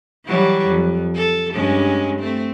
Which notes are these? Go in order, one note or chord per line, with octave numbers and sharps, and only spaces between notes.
E3 F#3 G3
F2
A4
G2 G#3 C#4
A3 C4